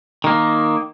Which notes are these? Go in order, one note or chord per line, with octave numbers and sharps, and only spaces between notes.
D#3 A#3